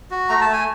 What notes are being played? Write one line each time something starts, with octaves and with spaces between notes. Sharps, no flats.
F#4
A3 A#5
A5
A3 G#5